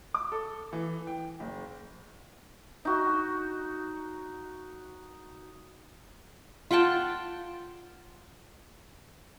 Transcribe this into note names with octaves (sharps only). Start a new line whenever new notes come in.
D6
A4
E3
G5
F#1
D#4 F#4
F4 F#5 G5 A5